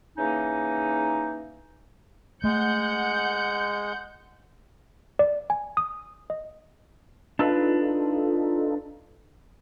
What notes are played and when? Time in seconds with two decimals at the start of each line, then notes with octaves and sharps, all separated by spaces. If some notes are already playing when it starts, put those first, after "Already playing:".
0.18 C#3 E3 A#3 C#4 D#4
2.44 G#3 A3 F#5 G6 C#7
5.19 D5
5.50 G#5
5.77 D#6
6.30 D#5
7.39 D4 D#4 F4 A4 B4